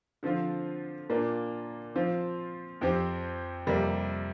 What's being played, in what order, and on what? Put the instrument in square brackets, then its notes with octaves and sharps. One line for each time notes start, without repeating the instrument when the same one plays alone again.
[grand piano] D3 F3 C4 F4
A#2 A#3 D4 F4
F3 C4 F4
F2 F3 C4 G4
F2 C3 G3 A#3